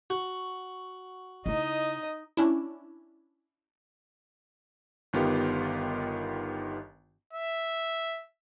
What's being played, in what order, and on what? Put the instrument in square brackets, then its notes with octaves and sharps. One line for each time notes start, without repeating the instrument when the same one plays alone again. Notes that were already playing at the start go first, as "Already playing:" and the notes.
[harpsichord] F#4
[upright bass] C#3 E4 [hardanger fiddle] D#4 D#5
[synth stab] C#4 D4 E4
[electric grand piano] G1 D#3 B3 F4 G4
[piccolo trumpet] E5